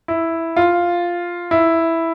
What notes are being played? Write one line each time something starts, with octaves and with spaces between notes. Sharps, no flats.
E4
F4
E4